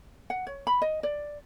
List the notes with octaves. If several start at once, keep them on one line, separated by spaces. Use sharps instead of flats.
F#5
C#5
B5
D#5
D5